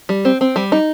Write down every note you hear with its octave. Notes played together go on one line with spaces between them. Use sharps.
G3
C4
C4
G3
D#4